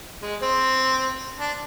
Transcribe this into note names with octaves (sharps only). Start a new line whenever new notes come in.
G#3
C4
D4